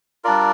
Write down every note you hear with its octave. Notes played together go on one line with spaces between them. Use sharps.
G3 D4 F4 A#4 D5